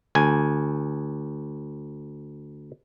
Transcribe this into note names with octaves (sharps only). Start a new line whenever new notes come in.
D2 G#5